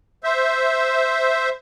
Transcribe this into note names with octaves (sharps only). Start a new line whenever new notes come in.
C5 E5